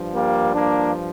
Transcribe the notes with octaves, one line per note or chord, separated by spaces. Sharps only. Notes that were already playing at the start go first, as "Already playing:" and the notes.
Already playing: G2 F3
G3 A#3
A#3 D4